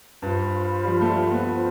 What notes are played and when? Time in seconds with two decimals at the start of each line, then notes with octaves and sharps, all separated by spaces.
0.22 G2 F4 C5 F5 B5
0.84 G3
0.88 F3
1.01 A3
1.10 G3
1.31 B3
1.54 F4 C5